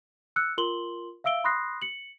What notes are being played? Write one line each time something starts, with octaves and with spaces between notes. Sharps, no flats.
E6 F#6 C#7
F4 A#4 C6 F#7 G7
E5 F5 E6 D7 G7
B5 C6 D#6 F#6 A#6 C7
C#7 F#7